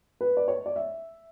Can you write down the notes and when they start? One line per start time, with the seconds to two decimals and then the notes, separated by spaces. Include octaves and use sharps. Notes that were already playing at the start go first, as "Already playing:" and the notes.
0.21 B4
0.37 D5
0.48 C#5
0.66 D5
0.76 E5